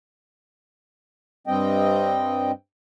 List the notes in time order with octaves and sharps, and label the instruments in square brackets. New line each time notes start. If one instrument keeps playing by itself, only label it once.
[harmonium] G2 G3 C4 D#5 G5